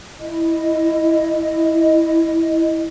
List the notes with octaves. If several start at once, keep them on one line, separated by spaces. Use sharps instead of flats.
E4 D#5